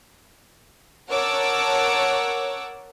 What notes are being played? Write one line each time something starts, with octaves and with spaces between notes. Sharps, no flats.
A#4 C#5 F#5 A5 D6 E6